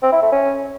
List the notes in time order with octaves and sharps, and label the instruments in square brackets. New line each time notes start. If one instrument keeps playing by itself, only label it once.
[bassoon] C4
E4
A3
C#4